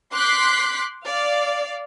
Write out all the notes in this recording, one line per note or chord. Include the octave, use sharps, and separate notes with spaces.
C6 D6 F#6 G6 B6 C7
D5 F5